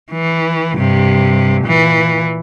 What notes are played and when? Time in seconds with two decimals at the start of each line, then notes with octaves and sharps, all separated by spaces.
0.12 E3
0.75 G2 C3
1.64 A#2 E3